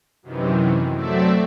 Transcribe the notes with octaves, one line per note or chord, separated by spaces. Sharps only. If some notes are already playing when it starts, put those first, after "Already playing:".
F#2 C3 D#3 E3
F#3 A3 C4 D5 E5